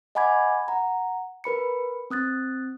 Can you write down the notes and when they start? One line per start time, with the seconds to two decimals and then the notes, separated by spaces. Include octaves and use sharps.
0.15 D#5 F#5 G#5 B5 D6 G#6
0.68 F#5 A#5
1.44 A#4 B4 B5 C#7
2.10 C4 D#6 F#6 A6